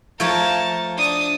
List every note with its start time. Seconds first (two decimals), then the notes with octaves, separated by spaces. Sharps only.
0.20 F3 A3 A#4 C#5 A5
0.97 D4 D#6